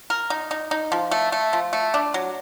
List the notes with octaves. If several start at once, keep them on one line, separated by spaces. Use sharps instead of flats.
A#4
D#4
D#4
D#4
F3
A3
A3
F3
A3
D4
F#3